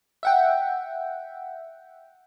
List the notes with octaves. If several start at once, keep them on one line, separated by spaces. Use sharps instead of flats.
E5 F#5 G5